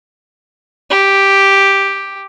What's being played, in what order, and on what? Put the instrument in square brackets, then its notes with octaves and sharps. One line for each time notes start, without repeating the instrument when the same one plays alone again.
[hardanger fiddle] G4